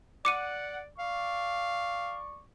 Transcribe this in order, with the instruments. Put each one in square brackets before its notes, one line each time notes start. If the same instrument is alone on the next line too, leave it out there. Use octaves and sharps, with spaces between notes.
[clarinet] D5 [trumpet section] F#5 [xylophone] D6 C#7 D#7
[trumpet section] D5 C#6 [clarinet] F5